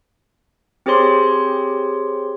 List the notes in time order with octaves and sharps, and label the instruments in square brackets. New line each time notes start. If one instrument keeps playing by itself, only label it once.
[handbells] C4 G4 G#4 C5 C#5 C6